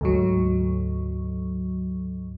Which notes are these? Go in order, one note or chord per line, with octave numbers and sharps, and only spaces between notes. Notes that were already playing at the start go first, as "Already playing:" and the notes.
D2 G#2 F#3